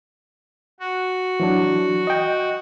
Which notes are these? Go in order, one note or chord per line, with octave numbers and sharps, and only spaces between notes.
F#4
E3 F#3 D4
D#5 G5